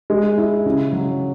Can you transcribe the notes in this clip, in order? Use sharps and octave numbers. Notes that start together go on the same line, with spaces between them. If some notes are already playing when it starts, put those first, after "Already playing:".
G#3
E4
C#3
F#3